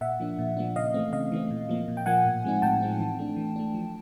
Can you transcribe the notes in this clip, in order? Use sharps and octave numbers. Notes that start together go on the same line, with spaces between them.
A#2 E5 F#5
F3 A#3 D4
A#2
F3 A#3 D4
C#3 D#5 F5
E3 A3 C4
C#3 D#5 F5
E3 A3 C4
A#2
F3 A#3
A#2
G5
F3 A#3 F#5 G#5
A2
F3 G#3 C4 D#4
A2 G5 A5
F3 G#3 C4 D#4
E3
A3 D4
E3
A3 D4
F3